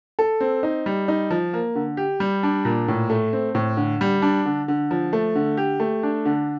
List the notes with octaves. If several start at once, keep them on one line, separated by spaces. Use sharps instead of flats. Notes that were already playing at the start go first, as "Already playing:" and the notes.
A4
C4
D#4
G3
D#4
F3
A#3
D3
G4
G3
D4
A#2
A2
A3
C4
A2
D3
G3
D4
D3
D3
F3
A3
D3
G4
A3
D4
D3